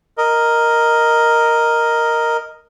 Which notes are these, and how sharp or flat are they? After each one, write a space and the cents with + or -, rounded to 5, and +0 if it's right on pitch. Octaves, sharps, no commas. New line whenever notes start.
A#4 +0 D#5 +0